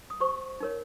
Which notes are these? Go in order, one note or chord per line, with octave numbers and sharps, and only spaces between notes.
D#6
G4 C5 C#6
D#4 A#4 C#5